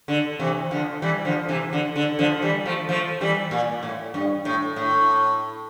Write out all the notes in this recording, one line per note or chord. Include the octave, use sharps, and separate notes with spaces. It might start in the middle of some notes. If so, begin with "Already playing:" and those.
D3
C3 E3
D3 F3
E3 G3
D3 F3
C3 E3
D3
D3
D3 F3
E3 G3
F3 A3
F3 A3
E3 G3
A#2
A2
G2
A2
A2